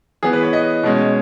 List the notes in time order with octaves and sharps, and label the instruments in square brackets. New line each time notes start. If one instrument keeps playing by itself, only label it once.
[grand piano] E3 B3 G#4
B4
C#5
D#5
B2 G#3 C#4